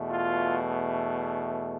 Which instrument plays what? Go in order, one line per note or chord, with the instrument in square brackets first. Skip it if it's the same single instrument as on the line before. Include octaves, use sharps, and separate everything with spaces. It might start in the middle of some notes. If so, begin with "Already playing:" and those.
Already playing: [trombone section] E2 B2 A3
F4